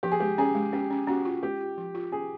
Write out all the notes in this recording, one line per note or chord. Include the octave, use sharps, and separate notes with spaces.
F3 G4
G#4
G#3 G4
C#4 G#4
G#3
C#4 G4
C#4
C#4 F#4
F4
G#3 G4
F4
F3
F4
C#4 G#4